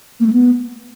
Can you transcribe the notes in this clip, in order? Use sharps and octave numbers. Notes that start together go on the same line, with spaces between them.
A#3
A3
B3